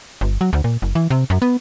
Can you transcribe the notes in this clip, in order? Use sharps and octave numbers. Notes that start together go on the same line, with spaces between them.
G1
F#3
D2
A#2
F#1
E3
C3
F#2
B3